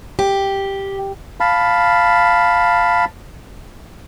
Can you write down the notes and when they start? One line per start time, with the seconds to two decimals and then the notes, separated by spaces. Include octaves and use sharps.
0.19 G4
1.40 F5 A5 B5